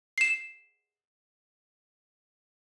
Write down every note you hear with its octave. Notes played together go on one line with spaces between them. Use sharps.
C7 E7